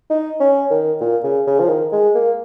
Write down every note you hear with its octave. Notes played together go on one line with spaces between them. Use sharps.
D#4
C#4
D#3
A#2
C#3
C#3
F3
D#3
G#3
A#3